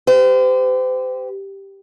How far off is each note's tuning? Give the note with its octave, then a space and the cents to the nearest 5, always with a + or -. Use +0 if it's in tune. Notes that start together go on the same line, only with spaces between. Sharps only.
G4 +0 C5 -40